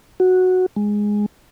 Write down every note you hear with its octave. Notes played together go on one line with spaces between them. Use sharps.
F#4
G#3